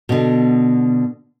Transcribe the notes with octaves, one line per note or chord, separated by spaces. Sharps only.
B2 D3